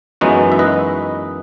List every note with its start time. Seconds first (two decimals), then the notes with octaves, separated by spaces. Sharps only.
0.21 F#2 E3 G#3 B3 D#4 F#4
0.52 E5
0.59 B4 D#5